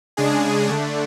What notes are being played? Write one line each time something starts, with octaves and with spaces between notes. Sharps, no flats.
C#3 G#3 D4 G#4
D3 A3 D4